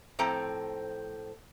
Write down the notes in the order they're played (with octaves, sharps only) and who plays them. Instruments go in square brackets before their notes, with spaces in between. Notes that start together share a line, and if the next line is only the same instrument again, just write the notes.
[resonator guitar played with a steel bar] A2 F3 C4 A4 A#5